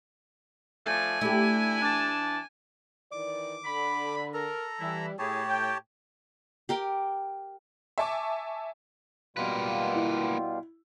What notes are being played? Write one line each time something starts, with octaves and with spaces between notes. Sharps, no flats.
F3 A3 D5 G#5
A3 D4 E4 G4
E3 D4 A5
D#3 E3 D5 D6
D3 B5
A4 A#4 A#5
E3 G3 E4
A2 E4 G4 G#4 C#5 A5
G5
G4 A#4 G5
E5 G#5 A5 C#6 D6
B2 G3 A#3 F4 B4
E4